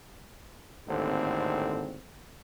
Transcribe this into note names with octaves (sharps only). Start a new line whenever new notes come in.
G#1 D#2 A2 D3 C4